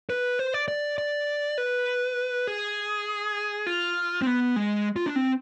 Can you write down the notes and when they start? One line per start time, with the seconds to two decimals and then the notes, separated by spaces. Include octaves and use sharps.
0.10 B4
0.39 C5
0.54 D5
0.68 D5
0.98 D5
1.58 B4
2.47 G#4
3.67 F4
4.22 C4
4.27 B3
4.56 G#3
4.96 F4
5.06 D4
5.16 C4